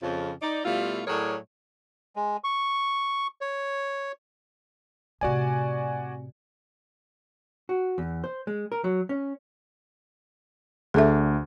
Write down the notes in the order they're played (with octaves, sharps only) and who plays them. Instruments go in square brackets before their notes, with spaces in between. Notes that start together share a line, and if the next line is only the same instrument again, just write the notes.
[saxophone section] F2 C#3 F3
D#4 D5
B2 G3 A3 E4 F4
A2 F#3 G#4 A#4 C#5 D5
[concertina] G#3
C#6
C#5
[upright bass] A2 C3 [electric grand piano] F#4 D5 G#5
[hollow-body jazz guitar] F#4
E2
C5
G#3
A#4
F#3
C#4
[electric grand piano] D2 D4 [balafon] G#4 A4 E5